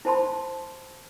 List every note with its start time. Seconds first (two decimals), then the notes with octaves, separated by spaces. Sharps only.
0.05 E4 C5 A5 B5 C6